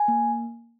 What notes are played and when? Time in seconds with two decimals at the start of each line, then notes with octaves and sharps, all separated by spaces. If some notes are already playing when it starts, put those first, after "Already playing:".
Already playing: G#5
0.08 A#3